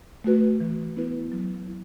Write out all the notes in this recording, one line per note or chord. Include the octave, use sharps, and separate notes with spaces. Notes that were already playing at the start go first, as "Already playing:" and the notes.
A3 F#4 B4
E3
B3 E4 B4
F#3
E4